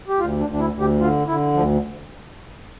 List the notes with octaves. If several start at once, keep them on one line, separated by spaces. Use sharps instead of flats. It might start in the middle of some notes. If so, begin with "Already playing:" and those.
G4
D2 F4
D4
D2
D4
E4
D2
G4
D3 F4
D3 E4
D2 F3